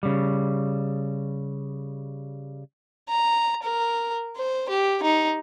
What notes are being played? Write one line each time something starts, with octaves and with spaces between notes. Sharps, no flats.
C#3 G3
A#5
A#4
C5
G4
D#4